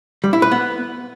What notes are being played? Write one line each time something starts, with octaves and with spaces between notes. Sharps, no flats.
G3
E4
B4
B3